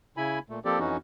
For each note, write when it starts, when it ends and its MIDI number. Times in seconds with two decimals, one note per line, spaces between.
0.17 0.39 49
0.17 0.39 64
0.17 0.39 80
0.17 0.39 83
0.50 0.59 46
0.50 0.59 57
0.65 0.79 53
0.65 0.79 58
0.65 0.79 60
0.65 0.79 67
0.65 0.79 69
0.65 0.79 74
0.79 0.97 41
0.79 0.97 52
0.79 0.97 61
0.79 0.97 63
0.79 0.97 66